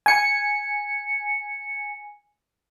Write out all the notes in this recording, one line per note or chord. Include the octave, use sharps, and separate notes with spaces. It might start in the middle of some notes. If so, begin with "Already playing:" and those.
G#5 C#7